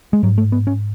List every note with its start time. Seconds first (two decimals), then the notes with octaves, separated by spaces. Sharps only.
0.13 G#3
0.23 G#2 F#3
0.38 A3
0.52 B3
0.67 C#4